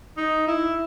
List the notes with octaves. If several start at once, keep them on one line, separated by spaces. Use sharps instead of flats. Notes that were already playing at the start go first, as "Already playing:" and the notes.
D#4
E4